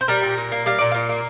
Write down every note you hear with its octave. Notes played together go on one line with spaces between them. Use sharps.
C5
G3 A#4
A#2
A#2
A#3
G3 F5
A#2 D5
A#2 F5
A#3